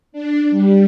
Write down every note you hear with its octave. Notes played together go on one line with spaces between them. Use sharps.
D4
G3